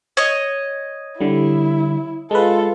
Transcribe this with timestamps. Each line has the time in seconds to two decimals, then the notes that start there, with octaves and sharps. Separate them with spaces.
0.17 C#5 D#5
1.20 D3 G3 E4
2.31 G#3 F4 A4 B4